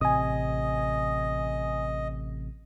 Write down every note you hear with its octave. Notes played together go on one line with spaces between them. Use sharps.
A1 C3 D#5 G#5 D#6